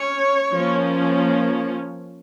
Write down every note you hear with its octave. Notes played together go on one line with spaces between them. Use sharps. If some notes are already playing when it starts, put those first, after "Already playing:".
Already playing: C#4 C#5
F3 A#3 C#4